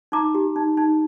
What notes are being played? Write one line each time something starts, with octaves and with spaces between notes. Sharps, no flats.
D#4 A#5 D6
G4
D#4
D#4